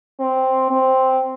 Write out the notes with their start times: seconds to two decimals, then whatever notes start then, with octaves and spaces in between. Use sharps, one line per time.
0.20 C4
0.71 C4